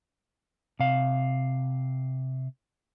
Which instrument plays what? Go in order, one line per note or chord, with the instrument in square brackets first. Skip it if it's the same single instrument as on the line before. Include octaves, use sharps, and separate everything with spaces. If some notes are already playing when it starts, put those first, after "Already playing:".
[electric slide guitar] C3 F5